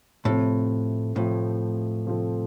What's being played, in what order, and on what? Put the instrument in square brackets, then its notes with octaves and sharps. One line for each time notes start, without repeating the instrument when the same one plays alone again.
[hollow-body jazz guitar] A2 [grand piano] C3 F3 A3 C4
[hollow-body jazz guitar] A2 [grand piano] C3 F3 A3 C4
[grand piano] C3 F3 A3 C4